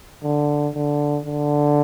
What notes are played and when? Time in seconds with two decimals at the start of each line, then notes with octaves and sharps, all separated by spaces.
0.24 D3
0.74 D3
1.25 D3